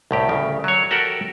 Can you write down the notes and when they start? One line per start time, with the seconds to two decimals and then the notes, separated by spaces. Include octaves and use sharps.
0.11 C2 A2 G4
0.29 D2 C#3
0.64 F#3 C#5
0.91 F#4 G4 A4 A#4 F#5